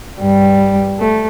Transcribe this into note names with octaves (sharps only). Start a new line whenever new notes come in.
G2 G3
A3